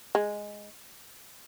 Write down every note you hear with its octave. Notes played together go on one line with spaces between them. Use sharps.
G#3